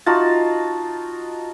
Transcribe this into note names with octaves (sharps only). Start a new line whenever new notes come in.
D#4 F4 F#4 A5